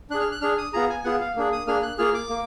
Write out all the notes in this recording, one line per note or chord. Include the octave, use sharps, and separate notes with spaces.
D4 G#4 F#6
F6
F#6
D4 G#4 F6
D#6
B3 F4 G#4 A#5
G#5
B3 F4 G#4 F#5
F5
A#3 D4 G#4
D#6
A#3 D4 G#4 F6
F#6
A#3 F4 G#4 F6
D6
A#3